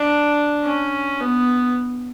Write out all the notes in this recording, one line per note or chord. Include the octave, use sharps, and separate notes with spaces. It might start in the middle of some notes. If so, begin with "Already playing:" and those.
Already playing: D4
C#4
B3